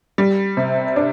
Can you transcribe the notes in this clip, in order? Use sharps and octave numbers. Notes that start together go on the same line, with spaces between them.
G3
C3
D4